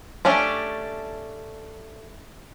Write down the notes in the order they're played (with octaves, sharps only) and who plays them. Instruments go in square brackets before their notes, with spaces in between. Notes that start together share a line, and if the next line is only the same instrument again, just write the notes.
[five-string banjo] A3 C#4 D4 G4